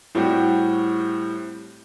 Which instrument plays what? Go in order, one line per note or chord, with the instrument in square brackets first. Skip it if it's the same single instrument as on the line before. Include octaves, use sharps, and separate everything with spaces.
[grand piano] A2 G3 C4 F#4 G4